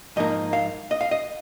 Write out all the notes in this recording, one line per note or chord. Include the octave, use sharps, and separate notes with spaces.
G#2 F3 A#3 D#4 D#5
F5
D#5
F5
D#5